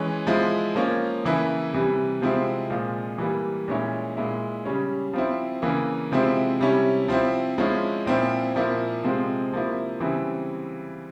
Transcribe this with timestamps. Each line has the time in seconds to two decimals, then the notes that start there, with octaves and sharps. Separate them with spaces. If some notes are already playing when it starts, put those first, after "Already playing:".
Already playing: E3 G#3 C#4
0.27 F3 G#3 E4
0.75 F3 A#3 C#4
1.24 C#3 E3 A#3 E4
1.73 C3 E3 G3
2.21 C3 F3 G#3 C4 E4
2.70 A#2 F3 G#3
3.18 E3 G3 A#3
3.68 A#2 G#3 C#4 E4
4.17 A#2 G#3 E4
4.65 C#3 G3 C#4
5.13 F3 C4 E4
5.62 C#3 E3 A#3
6.12 C3 F3 G#3 C4 E4
6.61 C3 G3 C#4 E4
7.08 F3 C4 E4
7.58 F3 G#3 C#4 E4
8.06 A#2 F3 C4 E4
8.55 A#2 F3 A#3 E4
9.04 C3 F3 G#3 C4
9.52 C3 F3 A#3 E4
10.00 C#3 E3 G3 C4 E4